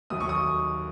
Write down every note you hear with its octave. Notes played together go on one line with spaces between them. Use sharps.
D#2 D#3 F#3 D#6
C#6
D#6